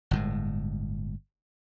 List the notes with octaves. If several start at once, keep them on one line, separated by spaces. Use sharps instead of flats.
G1 A2 G#3